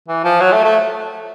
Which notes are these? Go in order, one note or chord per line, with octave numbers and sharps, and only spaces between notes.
E3
F3
F#3
A3
A3